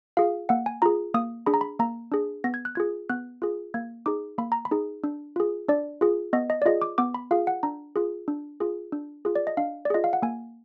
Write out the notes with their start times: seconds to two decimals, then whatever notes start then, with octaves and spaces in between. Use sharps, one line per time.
0.17 F4 G#4 F5
0.49 A#3 F#5
0.66 G#5
0.82 F4 G#4 A#5
1.14 A#3 D#6
1.46 D4 G#4 B5
1.54 A#5
1.61 B5
1.79 A#3 A#5
2.12 D4 G#4
2.44 B3 A#6
2.54 G#6
2.65 F#6
2.75 F4 G#4 G#6
3.10 B3 F#6
3.42 F4 G#4
3.74 A#3 G#6
4.06 D#4 G#4 D6
4.38 A#3 B5
4.52 A#5
4.65 B5
4.71 D#4 G#4
5.04 D4
5.36 F4 G#4
5.68 D4 D5
6.01 F4 G#4
6.33 B3 D#5
6.50 D#5
6.62 D5
6.66 F4 G#4 D#5
6.82 D6
6.98 B3 D6
7.14 B5
7.31 F4 G#4 F5
7.47 F#5
7.63 D4 A#5
7.96 F4 G#4
8.28 D4
8.60 F4 G#4
8.92 D4
9.25 F4 G#4
9.35 D5
9.47 D#5
9.57 D4 F5
9.85 D5
9.90 F4 G#4 D#5
10.04 F5
10.13 F#5
10.22 A#3 G#5